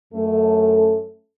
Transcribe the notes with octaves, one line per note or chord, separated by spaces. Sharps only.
F#2 A3 C#4 A4